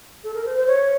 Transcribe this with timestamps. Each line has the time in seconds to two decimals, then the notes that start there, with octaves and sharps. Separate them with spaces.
0.24 A4
0.34 A#4
0.46 C5
0.56 C5
0.67 C#5